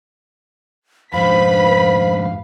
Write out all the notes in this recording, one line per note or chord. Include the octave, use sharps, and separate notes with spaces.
F2 G#2 B4 C5 F5 B5 B6